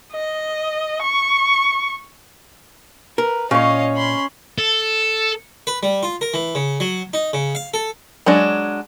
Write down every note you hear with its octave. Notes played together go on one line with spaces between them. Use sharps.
D#5
C#6
A#4 B4
A#2 C#4 C#5 D#5 F5
B5 C6
A4
B4
G3
F4
A#4
E3
C#3
F#3
D#4
C#3
F5
A4
F#3 G#3 D4